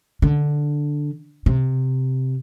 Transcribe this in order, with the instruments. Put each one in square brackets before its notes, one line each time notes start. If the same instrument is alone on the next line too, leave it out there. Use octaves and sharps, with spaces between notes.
[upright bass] D3
C3